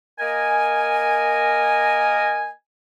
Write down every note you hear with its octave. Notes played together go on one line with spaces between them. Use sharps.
A#3 A#4 D#5 G#5